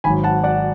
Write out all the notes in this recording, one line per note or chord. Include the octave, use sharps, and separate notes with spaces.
G#1 G#2 F#3 G#5 B5
F#5 A5
D5 F#5